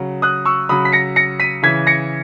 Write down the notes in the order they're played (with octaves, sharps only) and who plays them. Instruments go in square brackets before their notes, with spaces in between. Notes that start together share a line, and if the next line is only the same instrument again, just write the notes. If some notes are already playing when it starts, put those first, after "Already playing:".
Already playing: [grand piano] C#3 F#3
D#6 F#6
C#6 E6
C#3 F#3 B5 D#6
B6
A#6 C#7
A#6 C#7
B6 D#7
C#3 E3 G#6 B6
A#6 C#7